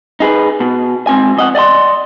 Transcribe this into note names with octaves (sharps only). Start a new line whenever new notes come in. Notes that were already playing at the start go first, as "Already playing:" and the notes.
D#4 G#4 B4
B2
G#2 C4 G#5
F2 D#5 F#5
D5 D#5 G5 C6